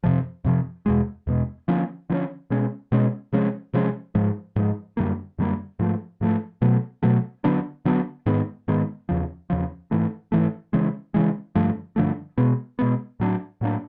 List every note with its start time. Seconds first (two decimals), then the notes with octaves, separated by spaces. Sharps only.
0.04 F2 C3 F3
0.45 F2 C3 F3
0.86 E2 B2 G#3
1.27 E2 B2 G#3
1.68 D3 F3 A#3 C#4
2.10 D3 F3 A#3 C#4
2.50 B2 G#3 C#4
2.92 B2 G#3 C#4
3.33 C3 F3 G#3 C#4
3.74 C3 F3 G#3 C#4
4.15 G#2 F3 G#3
4.56 G#2 F3 G#3
4.97 F#2 D3 G3 A#3
5.38 F#2 D3 G3 A#3
5.79 G#2 F3 A3
6.21 G#2 F3 A3
6.62 B2 F#3 A3
7.03 B2 F#3 A3
7.44 D3 F#3 B3 D4
7.85 D3 F#3 B3 D4
8.26 G#2 D#3 G#3 B3
8.68 G#2 D#3 G#3 B3
9.09 E2 C#3 F3
9.50 E2 C#3 F3
9.91 G#2 E3 A3
10.32 G#2 E3 A3
10.73 C#3 E3 G#3
11.14 C#3 E3 G#3
11.55 G2 D3 F3 A3
11.96 G2 D3 F3 A3
12.38 B2 G#3 B3
12.79 B2 G#3 B3
13.20 A2 F#3 A#3 D4
13.61 A2 F#3 A#3 D4